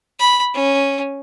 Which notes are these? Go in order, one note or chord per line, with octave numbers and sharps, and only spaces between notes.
B5
C#4